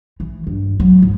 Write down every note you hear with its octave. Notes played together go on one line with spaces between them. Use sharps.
E3
G2
F#3
G#2